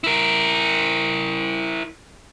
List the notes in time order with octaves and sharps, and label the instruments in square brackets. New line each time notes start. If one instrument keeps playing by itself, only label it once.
[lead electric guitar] E4 A#4